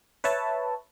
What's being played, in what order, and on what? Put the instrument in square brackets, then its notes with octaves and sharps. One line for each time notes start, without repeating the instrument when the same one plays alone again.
[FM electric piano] B4 C#5 E5 A5